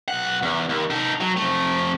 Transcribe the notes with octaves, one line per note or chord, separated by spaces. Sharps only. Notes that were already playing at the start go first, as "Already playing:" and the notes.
B1 F#5
E2
D#2
D#4 A4
F#3
F2 A3